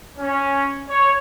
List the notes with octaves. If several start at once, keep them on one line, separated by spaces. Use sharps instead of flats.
C#4
C#5